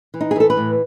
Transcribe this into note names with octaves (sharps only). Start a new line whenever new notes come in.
E3
D#4
G#4
E3 A4
B4
A2